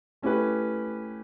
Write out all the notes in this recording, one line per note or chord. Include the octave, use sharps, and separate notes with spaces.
A3 C#4 E4 G4 B4